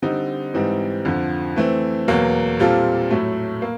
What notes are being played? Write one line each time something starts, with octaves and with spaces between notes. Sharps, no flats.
D3 G3 C4 D#4
G#2 E3 G3 C4 D#4
F2 D3 F3
E3 A3 C4
E2 B2 F#3 A#3
A#2 G3 C4 F4 A4
A2 F#3 A3
A#3